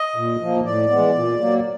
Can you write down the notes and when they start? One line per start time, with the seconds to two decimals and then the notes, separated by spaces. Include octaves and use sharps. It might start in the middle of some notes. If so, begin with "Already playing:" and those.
Already playing: D#5
0.16 A#2
0.40 F3 A#3
0.65 A2 D5
0.90 E3 G#3 B3
1.15 A#2
1.40 F#3 A#3